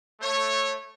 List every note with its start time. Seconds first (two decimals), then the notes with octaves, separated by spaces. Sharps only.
0.21 A3 C#5